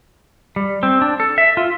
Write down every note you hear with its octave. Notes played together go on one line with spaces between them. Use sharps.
G3
C4
D4
A4
E5
F4